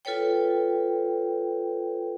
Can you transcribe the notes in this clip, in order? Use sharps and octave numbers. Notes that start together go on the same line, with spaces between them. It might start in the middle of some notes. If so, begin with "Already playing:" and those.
F4 A4 B4 C#5 G5